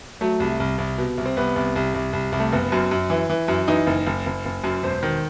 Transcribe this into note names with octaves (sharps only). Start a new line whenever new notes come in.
F#3 A3
C2
C2
C2
B2
C2
C4
C2 B3
C2
C2
C2
C2
C2
A3
F#1 B3
F#2
F#2
E3
E3
F#2
E3 D#4
F#1
F#1
F#1
F#1
F#2
E1 C5
D#3